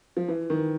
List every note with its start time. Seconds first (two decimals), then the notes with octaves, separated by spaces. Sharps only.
0.17 F3
0.28 E3
0.50 D#3